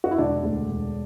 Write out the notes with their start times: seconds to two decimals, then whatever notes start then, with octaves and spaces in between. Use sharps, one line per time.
0.04 F#4
0.11 E4
0.18 E1 D4
0.43 D2
0.68 E1